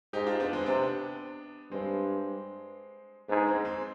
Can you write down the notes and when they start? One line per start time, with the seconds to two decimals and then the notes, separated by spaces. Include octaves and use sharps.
0.13 G#2 D#4 G4
0.26 D4 F4
0.40 B3 D4
0.53 G#3 C4
0.66 C3 B3 D4
1.71 G2 G#3 C4
3.29 G#2 B3 D4
3.47 G#3 C4
3.65 G#3 C4